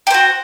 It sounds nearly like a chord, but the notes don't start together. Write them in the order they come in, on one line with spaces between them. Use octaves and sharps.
G4 C5 F#4